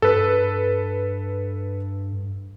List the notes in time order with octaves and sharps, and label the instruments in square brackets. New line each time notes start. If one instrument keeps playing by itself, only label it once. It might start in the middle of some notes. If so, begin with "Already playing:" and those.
[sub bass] G2 [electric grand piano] A4 B4